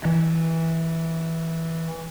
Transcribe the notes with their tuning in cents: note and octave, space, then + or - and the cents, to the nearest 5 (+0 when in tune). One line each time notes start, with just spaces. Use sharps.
E3 -10